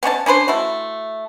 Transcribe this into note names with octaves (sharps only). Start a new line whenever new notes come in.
B3 C#4 C#5 A5
C#4 D4 B4 C5
A3 E4 F#4